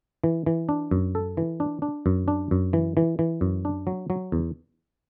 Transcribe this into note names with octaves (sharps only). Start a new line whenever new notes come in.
E3
E3
D4
F#2
A4
E3
D4
D4
F#2
D4
F#2
E3
E3
E3
F#2
D4
F#3
F#3
E2